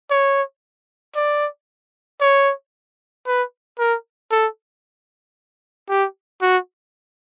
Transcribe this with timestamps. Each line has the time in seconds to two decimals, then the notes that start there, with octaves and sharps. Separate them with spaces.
0.11 C#5
1.16 D5
2.21 C#5
3.27 B4
3.79 A#4
4.31 A4
5.89 G4
6.42 F#4